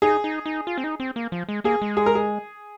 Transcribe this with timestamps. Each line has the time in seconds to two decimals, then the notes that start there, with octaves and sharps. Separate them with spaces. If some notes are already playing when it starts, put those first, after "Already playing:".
0.02 D#4 G#4
0.24 D#4
0.46 D#4
0.67 F4
0.78 C4
0.84 D#4
1.00 C4
1.16 A#3
1.32 F3
1.49 G#3
1.64 A#3 G#4
1.82 G#3
1.97 G#4
2.06 A#4
2.15 G#4